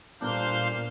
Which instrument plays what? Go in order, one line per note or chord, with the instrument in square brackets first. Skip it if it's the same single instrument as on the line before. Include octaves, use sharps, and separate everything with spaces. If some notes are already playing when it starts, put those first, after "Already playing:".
[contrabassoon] G1 [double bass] A#2 [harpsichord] A#3 D4 [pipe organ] C5 F5 G6